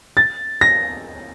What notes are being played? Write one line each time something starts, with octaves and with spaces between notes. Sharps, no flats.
A6
A#6